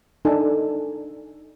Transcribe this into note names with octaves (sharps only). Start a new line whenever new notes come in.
D4 D#4 A4 G#5